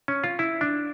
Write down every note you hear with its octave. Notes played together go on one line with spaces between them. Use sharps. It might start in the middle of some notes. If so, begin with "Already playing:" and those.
C#4
F4
E4
D4